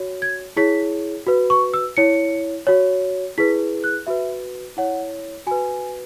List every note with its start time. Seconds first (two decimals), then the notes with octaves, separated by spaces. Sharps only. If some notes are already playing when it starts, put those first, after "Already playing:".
Already playing: F#4 C#5
0.22 G#6
0.57 E4 G#4 C#5 B6
1.27 F#4 B4
1.50 C#6
1.74 E6
1.97 E4 C#5 C#7
2.67 F#4 C#5
3.38 E4 G#4 B4 B6
3.84 F#6
4.07 F#4 B4 E5
4.77 E4 C#5 F#5
5.47 F#4 B4 G#5